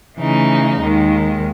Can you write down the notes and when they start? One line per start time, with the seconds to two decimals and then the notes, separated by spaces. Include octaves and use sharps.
0.18 C#3 E3 A3 D#4
0.80 D#2 D#3 G#3